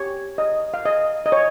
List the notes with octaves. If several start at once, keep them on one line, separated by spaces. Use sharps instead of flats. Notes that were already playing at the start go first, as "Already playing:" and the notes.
Already playing: G4 C#5
D#5
F5
D#5
D#5
C#5